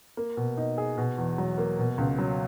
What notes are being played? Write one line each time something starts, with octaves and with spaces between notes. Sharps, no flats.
A#3
B2
D#4
G#4
B2
E2
F#3
A#3
B2
C#2
F#3